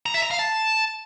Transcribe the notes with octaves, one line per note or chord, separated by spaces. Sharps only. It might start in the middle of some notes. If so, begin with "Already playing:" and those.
A#5
E5
A#5
F5
A5